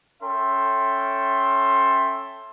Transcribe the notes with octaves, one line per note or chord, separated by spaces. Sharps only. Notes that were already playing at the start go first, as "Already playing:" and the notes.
C#4 A4 E5 G5 C6